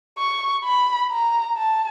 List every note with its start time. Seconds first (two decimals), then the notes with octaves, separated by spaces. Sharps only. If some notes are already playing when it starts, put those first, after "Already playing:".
0.19 C#6
0.65 B5
1.11 A#5
1.57 A5